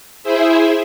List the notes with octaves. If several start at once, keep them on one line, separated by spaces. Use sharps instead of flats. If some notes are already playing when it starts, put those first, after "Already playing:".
E4 G#4 C5 E5